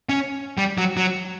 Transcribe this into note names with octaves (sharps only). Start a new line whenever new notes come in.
C#4
G3
F#3
F#3